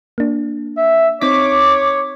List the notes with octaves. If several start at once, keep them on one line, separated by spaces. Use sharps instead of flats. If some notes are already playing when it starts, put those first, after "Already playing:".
A#3 D4
E5
C4 D#4 C#5 D6 B6